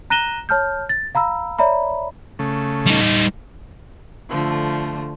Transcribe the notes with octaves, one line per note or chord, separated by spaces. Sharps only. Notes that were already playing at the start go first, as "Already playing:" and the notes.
A#5 F#6 A#6 D#7 E7 G7
C#5 A5 F6 G6
A6
F5 A#5 B5 E6
C#5 D5 E5 A#5 B5
C#3 A3
G3 D#4
D3 F3 A3